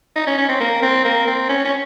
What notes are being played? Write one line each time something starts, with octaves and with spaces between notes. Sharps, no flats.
D#4
C#4
C#4
C4
A#3
C4
A#3
C4
C#4
C#4